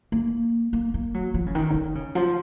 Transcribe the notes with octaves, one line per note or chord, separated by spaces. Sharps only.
A#3
A#3
A#3
F#3
F3
C#3
D#3
C#3
D#3
C#3
F3